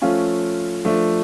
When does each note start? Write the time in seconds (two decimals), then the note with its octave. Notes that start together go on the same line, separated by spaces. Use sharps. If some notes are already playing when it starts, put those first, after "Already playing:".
0.02 F3 A3 C#4 F4
0.85 F3 A3 D4